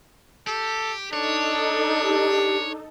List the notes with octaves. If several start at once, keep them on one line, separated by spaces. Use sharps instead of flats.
G4 A4
D4 D#4 A4 C#5
G4